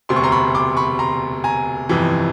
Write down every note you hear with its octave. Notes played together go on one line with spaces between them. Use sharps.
E1 D2 C3 C6
C#6
A#5 C6
B5 C#6
C6 D6
B5 C#6
A#5 C6
G#5 A#5
G1 F2 C3 E3